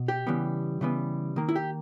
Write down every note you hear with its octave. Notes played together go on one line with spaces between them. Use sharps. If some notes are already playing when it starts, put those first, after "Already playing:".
Already playing: B2
G4
C#3 E3 G3 B3
C#3 E3 G3 B3
D#3 A#3
E4
G4